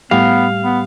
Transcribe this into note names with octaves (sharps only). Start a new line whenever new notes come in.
A2 G3 B3 G4 F5
B3